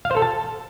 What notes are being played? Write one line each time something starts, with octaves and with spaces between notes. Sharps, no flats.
F5
C5
A4
A5